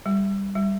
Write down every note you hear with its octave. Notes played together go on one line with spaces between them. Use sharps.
G3
G3